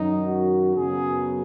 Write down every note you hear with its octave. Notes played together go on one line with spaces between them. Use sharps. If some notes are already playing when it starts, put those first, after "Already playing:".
Already playing: F#2 D#3 F#3 D#4
F#4
F#2 C#3 F#3 B3 G#4